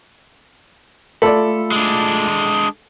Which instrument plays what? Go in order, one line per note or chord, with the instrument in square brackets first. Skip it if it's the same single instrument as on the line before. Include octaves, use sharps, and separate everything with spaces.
[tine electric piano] A3 F4 B5 [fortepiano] A4 D5
[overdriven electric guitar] G#3 D4